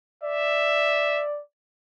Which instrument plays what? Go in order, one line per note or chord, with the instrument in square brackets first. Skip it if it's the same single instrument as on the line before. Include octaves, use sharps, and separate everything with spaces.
[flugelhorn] D5 [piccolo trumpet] E5